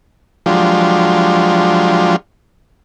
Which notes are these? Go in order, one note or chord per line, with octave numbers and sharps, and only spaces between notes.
F3 F#3 G#3 D4 F4 G4